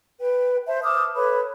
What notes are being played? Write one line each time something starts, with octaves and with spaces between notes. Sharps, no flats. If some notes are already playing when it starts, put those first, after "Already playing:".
B4 G5
C5 E5 A5
A5 D6 D#6 F6
A4 B4 C#5 B5